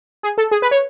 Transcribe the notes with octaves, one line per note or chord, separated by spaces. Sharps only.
G#4
A4
G#4
B4
C#5